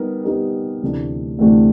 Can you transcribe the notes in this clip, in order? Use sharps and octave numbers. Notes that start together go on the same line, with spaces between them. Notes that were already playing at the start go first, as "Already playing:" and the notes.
Already playing: G3 B3 D#4 G4 A#4
G3 B3 D#4 G4 A#4
D2 C3 E3 A3 D4
D2 C3 E3 A3 D4